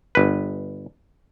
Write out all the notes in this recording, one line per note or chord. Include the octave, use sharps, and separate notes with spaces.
G1 B4